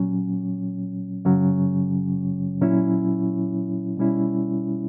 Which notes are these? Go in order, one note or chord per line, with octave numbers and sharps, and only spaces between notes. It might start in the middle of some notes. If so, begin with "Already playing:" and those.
Already playing: A#2 F#3 C#4
F#2 C#3 F#3 C#4
A#2 F#3 C#4 E4
B2 G3 C#4 E4